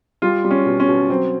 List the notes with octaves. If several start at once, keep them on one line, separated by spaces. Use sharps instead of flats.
G3 F4
G3
C#4
B2
C#4
B2
F#3 C4